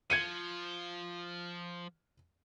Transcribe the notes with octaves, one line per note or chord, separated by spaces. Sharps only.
F3 G#6 C#7 D#7